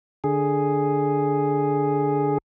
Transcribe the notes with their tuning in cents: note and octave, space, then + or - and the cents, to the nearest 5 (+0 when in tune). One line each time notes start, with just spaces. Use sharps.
D3 +0 G#4 +0